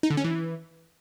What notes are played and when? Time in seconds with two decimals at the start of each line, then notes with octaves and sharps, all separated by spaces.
0.03 D#4
0.10 D3
0.17 C#4
0.24 E3